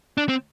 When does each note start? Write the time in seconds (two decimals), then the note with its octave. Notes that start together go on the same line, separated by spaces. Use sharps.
0.18 D4
0.29 C4